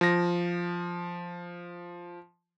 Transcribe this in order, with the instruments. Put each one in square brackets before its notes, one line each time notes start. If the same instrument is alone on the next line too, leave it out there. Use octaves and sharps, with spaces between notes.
[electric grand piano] F3 A#6